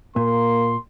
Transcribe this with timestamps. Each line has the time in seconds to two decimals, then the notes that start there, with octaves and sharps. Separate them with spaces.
0.16 A#2 A#3 C6